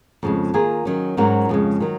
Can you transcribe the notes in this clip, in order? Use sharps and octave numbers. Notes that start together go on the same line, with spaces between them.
F2 C#3 G#3
D#3 A#3 F4 G#4
D#3 F#3 C#4
G#2 F#3 C#4 F#4 A#4
F2 C#3 G#3
D#3 F#3